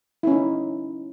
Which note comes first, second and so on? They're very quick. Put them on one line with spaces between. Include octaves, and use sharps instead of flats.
E4 C#4 D#4